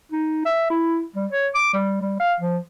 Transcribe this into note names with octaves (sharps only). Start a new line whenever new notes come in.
D#4
E5
E4
G3
C#5
D6
G3
G3
F5
F3